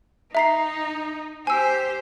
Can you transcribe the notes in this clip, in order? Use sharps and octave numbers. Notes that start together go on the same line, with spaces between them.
D#4 E5 A#5 C7
G4 C5 G#5 E6